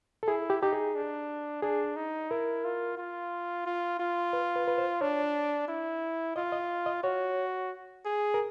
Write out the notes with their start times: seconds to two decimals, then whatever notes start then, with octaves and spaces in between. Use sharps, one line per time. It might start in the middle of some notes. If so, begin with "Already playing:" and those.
0.23 A4
0.28 E4 G#4
0.50 G4
0.62 D#4 G4
0.73 G#4
0.95 D4
1.62 D4 G#4
1.96 D#4
2.31 E4 A#4
2.65 F4
2.97 F4
3.66 F4
4.00 F4
4.33 B4
4.56 B4
4.68 B4
4.78 C5
5.01 D4 C#5
5.68 E4
6.36 F4 D#5
6.52 D#5
6.86 D#5
7.03 F#4 C#5
8.05 G#4
8.34 A#4